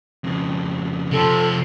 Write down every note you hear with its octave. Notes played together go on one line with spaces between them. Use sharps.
F2 C#3
C3 F3 A4